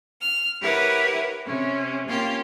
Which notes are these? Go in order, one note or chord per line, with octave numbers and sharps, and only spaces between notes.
F6
E4 G4 A#4 B4 C#5 F#5
C3 C#4
A#3 C#4 F4 G4